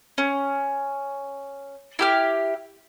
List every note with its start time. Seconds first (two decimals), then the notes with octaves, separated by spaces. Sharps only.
0.18 C#4
1.99 E4 G4 F6